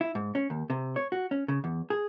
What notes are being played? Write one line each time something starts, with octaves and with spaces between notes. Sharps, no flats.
E4
G#2
C#4
D#2
C3
C#5
F#4
C#4
C#3
E2
G#4